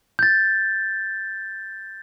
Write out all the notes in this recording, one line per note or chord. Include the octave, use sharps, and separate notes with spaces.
G6 A6